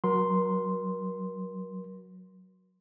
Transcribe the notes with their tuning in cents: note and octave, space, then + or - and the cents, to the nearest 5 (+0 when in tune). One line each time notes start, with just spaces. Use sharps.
F#3 +0 A#4 +35 C6 +0